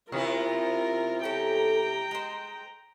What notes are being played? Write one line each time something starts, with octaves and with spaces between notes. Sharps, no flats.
C3 B3 E4 F4 A#4
C#4 G4 A4 G5 A#5
G#3 C5